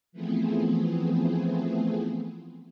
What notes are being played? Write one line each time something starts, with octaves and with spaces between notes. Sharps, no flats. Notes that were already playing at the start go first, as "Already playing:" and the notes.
E3 F3 A3 B3 C4 G#4